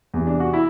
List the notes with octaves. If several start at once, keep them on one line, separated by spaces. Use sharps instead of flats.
E2 C3 E3
D4
F#4
E4